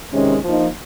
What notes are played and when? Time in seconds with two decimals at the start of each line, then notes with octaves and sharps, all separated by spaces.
0.13 C3 D#3 G#3 C#4
0.44 F3 A#3 D#4